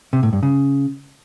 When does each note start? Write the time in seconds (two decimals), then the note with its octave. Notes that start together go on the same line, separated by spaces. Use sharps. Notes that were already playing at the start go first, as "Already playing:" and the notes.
0.13 C3
0.23 A2
0.33 G2
0.43 C#3